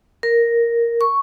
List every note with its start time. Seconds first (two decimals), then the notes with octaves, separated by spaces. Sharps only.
0.23 A#4
1.01 C#6